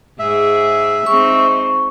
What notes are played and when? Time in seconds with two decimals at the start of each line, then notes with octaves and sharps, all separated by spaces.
0.19 G#2 G#4 E5
1.06 G#3 C4 D#4 C#6